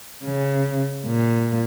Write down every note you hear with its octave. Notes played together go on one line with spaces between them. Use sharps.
C#3
A#2